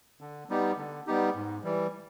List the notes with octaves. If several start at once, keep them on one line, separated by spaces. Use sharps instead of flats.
D3
G3 B3 D#4 G4
D3
G3 B3 D#4 G4
G#2
E3 G3